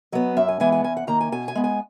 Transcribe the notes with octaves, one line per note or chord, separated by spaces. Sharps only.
F#3 B3 D#5
F#2 E5
G#5
E3 G#3 B3 G#5
G#5
E2 G#5
F#5
D#3 A#3 A#5
G#5
B2 G#5
G#5
G#3 B3
G#5